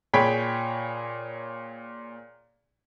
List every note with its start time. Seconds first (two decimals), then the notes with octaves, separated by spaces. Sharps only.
0.13 A#2 G#4 C#5 G5 B5 B6